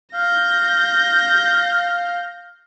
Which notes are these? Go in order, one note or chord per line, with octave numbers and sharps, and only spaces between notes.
F5 G6 A#6